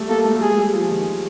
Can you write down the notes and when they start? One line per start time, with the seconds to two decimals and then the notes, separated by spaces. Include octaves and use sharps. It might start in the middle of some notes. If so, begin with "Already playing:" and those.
Already playing: G3 A3
0.09 A#3 A4
0.25 A3
0.36 G3
0.41 G#3 G#4
0.58 G3
0.73 F3
0.90 D#3